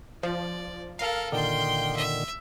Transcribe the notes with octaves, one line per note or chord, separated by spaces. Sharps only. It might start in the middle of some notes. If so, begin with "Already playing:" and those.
F3 D5
A4 A#4 F5
A#2 D3 D#3 G5 C6
E5